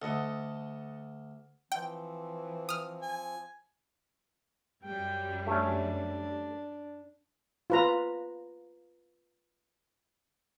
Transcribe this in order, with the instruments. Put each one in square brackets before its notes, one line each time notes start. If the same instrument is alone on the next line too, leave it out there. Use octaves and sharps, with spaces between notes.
[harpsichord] D2 [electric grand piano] A4 D#5 F#5
[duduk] E3 [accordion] F3 C4 [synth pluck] G5
[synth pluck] D#6 F6
[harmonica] G#5
[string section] F#2 G3 [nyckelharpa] G5
[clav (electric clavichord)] A3 C#4 [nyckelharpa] D4
[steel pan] F4 B4 A#5